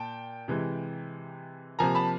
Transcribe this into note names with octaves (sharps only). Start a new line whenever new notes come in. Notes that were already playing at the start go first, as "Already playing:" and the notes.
Already playing: A#2 G5 A5
C3 E3 G#3
C3 F3 A#3 G#5 A#5
A5 B5